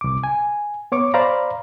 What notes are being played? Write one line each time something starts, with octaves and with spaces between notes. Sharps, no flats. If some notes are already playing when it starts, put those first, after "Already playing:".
C2 D6
G#5
B3 C#5 C#6 D6
C5 D5 F5 A#5 B5